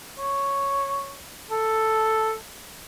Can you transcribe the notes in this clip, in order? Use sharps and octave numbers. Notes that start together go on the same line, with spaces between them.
C#5
A4